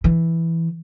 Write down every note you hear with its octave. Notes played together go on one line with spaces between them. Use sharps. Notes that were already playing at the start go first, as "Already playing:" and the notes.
E3